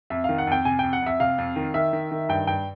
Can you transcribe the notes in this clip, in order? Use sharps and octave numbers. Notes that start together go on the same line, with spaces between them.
F2 E5
D#3 F5
F#5
F2 G5
C3 G#5
F2 G5
F#5
F2 E5
C3 F5
F2
D#3
D#3 E5
D#3
D#3
G2 G5
G2 G5